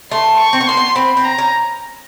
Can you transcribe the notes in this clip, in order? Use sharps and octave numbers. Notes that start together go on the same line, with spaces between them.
A3 C6
C#6
C4
B3
A#3 C6
B3
C4 B5
C4
A#5
C#4